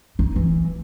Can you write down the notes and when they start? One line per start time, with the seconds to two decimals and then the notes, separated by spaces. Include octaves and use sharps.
0.19 D#4
0.36 E3